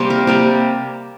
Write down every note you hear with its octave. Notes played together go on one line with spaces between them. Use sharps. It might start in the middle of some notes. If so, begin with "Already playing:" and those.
Already playing: C3 G3 A#3 C5
A#4
C3 G3 A#3 D5